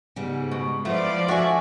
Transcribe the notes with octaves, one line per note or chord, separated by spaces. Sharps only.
G#2 C#3 G3 B3
B2
F3 A3 B3 E4 D5
A3 D4 F#4 E5 F#5 G#5